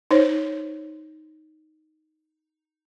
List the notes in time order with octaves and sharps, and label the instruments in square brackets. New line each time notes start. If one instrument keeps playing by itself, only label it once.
[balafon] D#4 C5 C#5